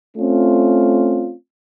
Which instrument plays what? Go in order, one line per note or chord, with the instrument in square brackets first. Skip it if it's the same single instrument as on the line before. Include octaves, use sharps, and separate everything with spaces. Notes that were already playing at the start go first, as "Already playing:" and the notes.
[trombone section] A3 C4 C#4 F4